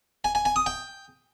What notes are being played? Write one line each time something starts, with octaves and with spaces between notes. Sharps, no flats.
G#5
G#5
G#5
D#6
G5